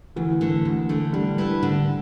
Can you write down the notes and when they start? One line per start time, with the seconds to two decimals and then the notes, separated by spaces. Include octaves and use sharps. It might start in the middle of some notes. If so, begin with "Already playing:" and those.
0.16 D2 E3
0.41 D3 A3
0.65 D2
0.89 D3 A3
1.13 D3 G3
1.38 A3 E4 B4
1.63 D3